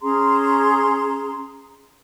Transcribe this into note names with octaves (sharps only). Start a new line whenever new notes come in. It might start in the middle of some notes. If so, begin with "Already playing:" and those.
C#4 G#4 A#5 C6